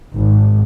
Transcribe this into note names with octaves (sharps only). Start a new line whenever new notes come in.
G#1